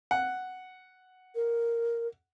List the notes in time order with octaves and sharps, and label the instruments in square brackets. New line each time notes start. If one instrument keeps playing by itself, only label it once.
[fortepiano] F#5
[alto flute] A#4